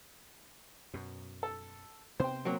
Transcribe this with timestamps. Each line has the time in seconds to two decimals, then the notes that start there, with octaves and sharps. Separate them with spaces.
0.94 F#2 B2
1.43 A4
2.20 C3 B3 C5 G5
2.45 F#3 A#3 C4